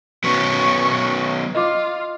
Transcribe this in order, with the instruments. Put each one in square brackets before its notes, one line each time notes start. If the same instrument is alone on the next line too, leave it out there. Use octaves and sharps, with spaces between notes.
[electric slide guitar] F#3 B3 C#4 [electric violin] C#6
[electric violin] F4 [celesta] D#5 D6